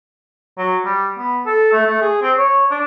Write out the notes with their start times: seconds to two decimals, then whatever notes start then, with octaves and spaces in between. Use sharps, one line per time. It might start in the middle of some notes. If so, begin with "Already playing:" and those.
0.58 F#3
0.85 G3
1.18 B3
1.46 A4
1.72 A3
1.87 A3
2.01 G#4
2.22 C4
2.38 C#5
2.71 D4